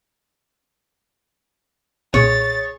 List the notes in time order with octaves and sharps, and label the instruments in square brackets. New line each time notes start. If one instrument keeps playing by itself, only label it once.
[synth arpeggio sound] B1 A#2 [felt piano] G#4 [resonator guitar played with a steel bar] C#5 [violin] A6